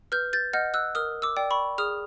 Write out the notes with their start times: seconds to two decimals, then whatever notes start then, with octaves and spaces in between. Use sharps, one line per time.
0.12 B4 F6 G6
0.33 G6 A6
0.53 D#5 F#5 F6 G6
0.74 E6 F#6
0.95 A#4 D#6 F6
1.22 D6 E6
1.37 D5 G5
1.51 B5 C#6
1.78 G#4 D#6 F6